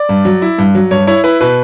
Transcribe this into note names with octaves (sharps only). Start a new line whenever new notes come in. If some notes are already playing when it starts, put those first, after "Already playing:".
Already playing: D5
G2
F#3
E4
G2
F#3
G2 C#5
E4 C#5
E4 B4
B2 B4